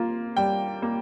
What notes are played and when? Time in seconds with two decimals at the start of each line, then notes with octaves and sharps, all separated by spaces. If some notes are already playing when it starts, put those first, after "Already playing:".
Already playing: A#3 F4
0.37 G3 G5
0.82 A#3